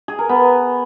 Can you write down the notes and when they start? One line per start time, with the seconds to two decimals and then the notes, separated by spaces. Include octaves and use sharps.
0.08 G#4
0.19 A#4
0.29 B3